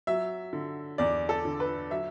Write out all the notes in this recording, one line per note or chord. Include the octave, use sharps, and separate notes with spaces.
F#3 E5
D3
E2 D5
A4
D3
B4
F#3 E5